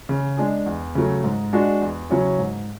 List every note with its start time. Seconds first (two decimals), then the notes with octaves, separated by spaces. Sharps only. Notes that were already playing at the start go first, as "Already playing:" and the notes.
0.09 C#3
0.37 G#3 D4 G#4
0.66 E2
0.95 C#3 F#3 A3
1.24 G#2
1.53 G#3 D4 F#4
1.81 E2
2.10 C#3 F#3 C#4 E4
2.39 G#2